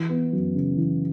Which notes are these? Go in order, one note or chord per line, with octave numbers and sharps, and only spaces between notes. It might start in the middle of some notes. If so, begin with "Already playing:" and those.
Already playing: E3
B3
F#2
C#3
E3